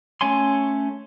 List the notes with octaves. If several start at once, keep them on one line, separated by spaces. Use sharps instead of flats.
A3 C#4 C#5 G#5 C6